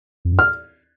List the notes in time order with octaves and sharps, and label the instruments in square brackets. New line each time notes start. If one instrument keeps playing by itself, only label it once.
[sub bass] F2
F#2
[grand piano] F6